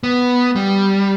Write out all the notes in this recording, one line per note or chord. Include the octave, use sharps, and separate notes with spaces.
B3
G3